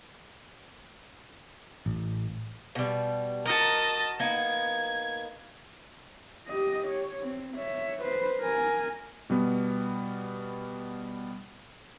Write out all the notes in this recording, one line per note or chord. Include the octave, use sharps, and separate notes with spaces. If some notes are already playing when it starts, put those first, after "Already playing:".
A1
B2 G3
F#4 A#4 D#5 A5
A#3 B3 D#4 G#6
G4 D#5
C#5
C4
C#5 E5
B4 C5
A#4 G#5
B2 G3 B3